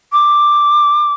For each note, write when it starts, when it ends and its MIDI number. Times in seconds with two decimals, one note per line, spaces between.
0.13 1.14 86